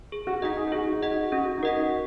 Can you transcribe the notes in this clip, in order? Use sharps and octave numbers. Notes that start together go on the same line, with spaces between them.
G#4
F#4
D#4 D#5 F#5
G#4
D#4
F#4 G#4
D#4
D#5 F#5
F#4
C#4 F#4
D#4
F#4 A#4 D#5 F#5